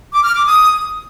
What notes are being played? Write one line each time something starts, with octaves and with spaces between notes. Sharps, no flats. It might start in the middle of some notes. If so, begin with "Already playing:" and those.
D6
F6
D6
D#6